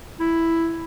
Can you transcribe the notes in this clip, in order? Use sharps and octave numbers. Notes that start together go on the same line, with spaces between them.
E4